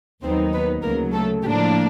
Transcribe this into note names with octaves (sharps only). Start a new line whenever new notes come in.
D#2 D#3 F#3 B3 C4 D#4 C5
B3 B4
D2 C#3 F#3 A#3 A#4
A3 A4
A2 F3 A#3 D4 G4